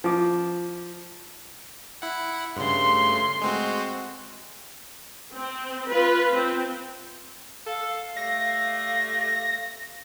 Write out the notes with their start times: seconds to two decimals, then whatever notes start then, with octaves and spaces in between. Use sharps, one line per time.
0.04 F3 D6
2.02 E4 F#5
2.57 G2 C#3 A3 C6
3.42 G#3 C4 F#4
5.33 C4
5.87 F4 B4
6.31 C4
7.67 A4 F5
8.17 G3 A3 A#6